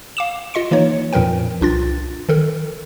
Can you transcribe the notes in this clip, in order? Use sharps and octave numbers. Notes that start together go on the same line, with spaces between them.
F5 D6 E7
F4 D#5 C6 C#7
E3 A#3 D#4 C#5
F2 A#2 F3 A#4 B4 G5
C2 D4 F4 A6
D#3 A4 A#4